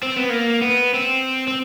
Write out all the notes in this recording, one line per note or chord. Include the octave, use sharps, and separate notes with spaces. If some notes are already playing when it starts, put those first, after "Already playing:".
C4
B3
A#3
B3
C4
C4